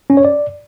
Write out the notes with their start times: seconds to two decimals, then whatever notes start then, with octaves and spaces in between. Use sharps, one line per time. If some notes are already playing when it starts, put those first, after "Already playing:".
0.10 C#4
0.17 C#5
0.25 D5